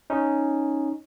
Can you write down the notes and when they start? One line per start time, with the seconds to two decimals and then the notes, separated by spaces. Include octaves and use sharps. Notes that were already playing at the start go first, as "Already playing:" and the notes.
0.10 C#4 D#4